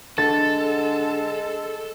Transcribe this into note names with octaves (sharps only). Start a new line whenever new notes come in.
D3 G#3 A4 A6